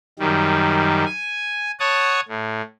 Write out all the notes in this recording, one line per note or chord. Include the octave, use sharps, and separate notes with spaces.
F#2 D#3 G3
G#5
C#5 F#5 A5 C#6 D#6
A2